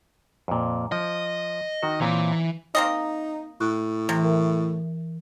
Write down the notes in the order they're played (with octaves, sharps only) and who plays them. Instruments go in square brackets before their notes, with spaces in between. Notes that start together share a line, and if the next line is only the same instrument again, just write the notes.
[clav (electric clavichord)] F2 A#2
[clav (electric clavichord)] F3 [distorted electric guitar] D#5
[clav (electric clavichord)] D#3 F#4
[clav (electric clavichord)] A#2 C4 C#5 [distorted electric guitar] E3
[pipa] A#3 C4 D#5 [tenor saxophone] D#4
[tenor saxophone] A2 [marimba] F#6
[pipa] C3 [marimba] E3
[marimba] A#4 E5